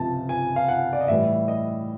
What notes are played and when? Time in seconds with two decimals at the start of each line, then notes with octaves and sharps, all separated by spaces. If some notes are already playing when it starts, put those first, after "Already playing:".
Already playing: C#2 C3 F3 A5
0.29 G#5
0.56 F5
0.68 F#5
0.93 D5
1.01 D#5
1.08 A2 E3 G3 E5
1.48 D#5